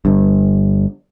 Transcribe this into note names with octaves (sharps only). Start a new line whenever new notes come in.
G1 G2